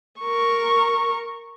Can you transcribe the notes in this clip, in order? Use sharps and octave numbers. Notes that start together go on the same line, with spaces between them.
A#4 C#6